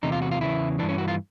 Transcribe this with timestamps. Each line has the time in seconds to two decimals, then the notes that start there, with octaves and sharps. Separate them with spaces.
0.03 E2 C3 D#4
0.12 F4
0.22 F#4
0.31 F4
0.41 E2 C#3 E3 E4
0.79 E3 D4
0.83 G2
0.89 C#4
0.98 F#4
1.08 F4